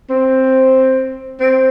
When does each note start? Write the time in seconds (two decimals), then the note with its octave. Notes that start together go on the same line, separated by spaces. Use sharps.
0.10 C4
1.40 C4